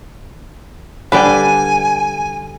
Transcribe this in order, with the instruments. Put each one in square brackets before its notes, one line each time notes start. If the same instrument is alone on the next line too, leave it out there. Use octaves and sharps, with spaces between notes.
[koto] D3 G3 D4 [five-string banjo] B4 D5 G5 [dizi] G#5